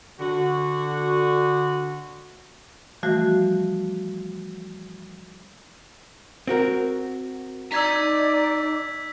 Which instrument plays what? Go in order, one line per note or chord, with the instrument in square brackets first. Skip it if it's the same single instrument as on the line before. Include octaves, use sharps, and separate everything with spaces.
[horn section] D3 F#4
[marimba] E3 F3 G3 A3 F#4
[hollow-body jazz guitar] C4 F#4 A#4
[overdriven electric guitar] D#4 A#5 [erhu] D5 [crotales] E6 G#6 B6